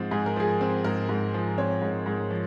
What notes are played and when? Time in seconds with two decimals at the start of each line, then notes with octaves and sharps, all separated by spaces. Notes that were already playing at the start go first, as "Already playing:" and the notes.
Already playing: G#2 F3 C4
0.11 G#2 G#4
0.26 A#4
0.36 F3 G#4
0.61 C4
0.84 G#2 A#4
1.09 G#2
1.34 F3
1.58 C4 C#5
1.82 G#2
2.06 G#2
2.30 F3